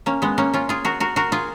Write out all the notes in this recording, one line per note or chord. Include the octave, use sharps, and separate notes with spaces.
A#3 C#4
G#3 B3
A#3 C#4
C#4 F4
F4 G#4
F#4 A#4
F#4 A#4
F#4 A#4
F4 G#4